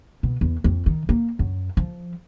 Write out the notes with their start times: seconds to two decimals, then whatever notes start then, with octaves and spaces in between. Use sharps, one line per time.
0.23 B2
0.41 E2
0.64 F2
0.86 D#3
1.09 A#3
1.39 F#2
1.77 F3